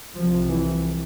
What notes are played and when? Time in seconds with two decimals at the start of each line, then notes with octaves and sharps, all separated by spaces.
0.15 C2 C3 F3
0.49 E3